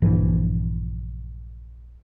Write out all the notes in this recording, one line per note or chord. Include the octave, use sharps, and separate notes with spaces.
A#1 G2 E3 F3